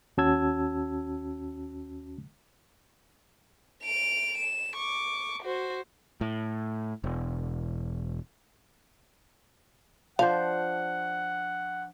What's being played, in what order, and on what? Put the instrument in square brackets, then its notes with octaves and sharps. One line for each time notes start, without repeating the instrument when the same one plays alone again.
[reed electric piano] D#2 C#4 F#4 A5 E6 G#6
[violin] D7 F7
E7
C#6 D6
F#4 C5
[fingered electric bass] A2
E1
[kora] F3 D4 C5 [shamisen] F5 [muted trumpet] F#5